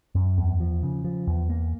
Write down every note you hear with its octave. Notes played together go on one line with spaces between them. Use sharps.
F#2
E2
F3
C#3
F3
E2
A#3